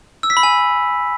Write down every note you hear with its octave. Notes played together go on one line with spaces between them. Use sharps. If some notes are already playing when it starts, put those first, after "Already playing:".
E6
B6
B5
G#5